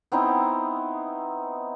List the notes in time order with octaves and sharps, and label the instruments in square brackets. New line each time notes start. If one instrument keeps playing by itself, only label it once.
[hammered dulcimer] B3 C4 D#4 E4